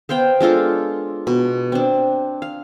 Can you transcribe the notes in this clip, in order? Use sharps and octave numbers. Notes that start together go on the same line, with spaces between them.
B3 C5 F5 G5
G#3 D4 F4 A4
B2
C4 D4
F5